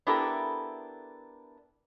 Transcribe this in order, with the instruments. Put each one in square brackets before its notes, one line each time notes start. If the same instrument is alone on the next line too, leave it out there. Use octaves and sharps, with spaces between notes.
[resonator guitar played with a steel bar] B3 D4 E4 G4 A4 A#4